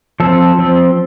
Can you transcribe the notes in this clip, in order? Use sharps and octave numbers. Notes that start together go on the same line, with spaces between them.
F3 C4 A4
F3 C4